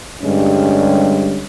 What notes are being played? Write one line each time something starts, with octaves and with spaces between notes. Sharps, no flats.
G2 D3 G3 G#3 C#4